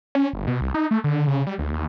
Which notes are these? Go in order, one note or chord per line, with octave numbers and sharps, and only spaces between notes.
C#4
G1
B2
C2
D#4
A3
D3
C#3
G3
D2
D#2